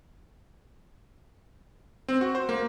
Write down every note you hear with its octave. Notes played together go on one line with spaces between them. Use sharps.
C4
F#4
C5
A#3